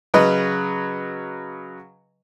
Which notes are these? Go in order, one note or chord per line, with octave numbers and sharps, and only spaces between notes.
C#3 F#3 B4 D#5